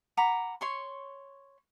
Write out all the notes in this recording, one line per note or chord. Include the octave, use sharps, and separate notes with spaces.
F#5 A#5 B5 D6
C#5 C6 C#6